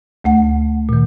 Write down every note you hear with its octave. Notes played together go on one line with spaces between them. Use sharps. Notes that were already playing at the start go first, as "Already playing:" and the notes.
D2 A3 F#5
A#2 D#3